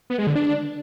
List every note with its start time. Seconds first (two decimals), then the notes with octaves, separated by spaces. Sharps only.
0.10 B3
0.18 G#3
0.27 D3
0.35 D4